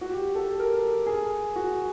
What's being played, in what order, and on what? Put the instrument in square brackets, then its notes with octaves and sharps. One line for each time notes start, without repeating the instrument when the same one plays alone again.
[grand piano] F#4
G4
A4
A#4
G#4
F#4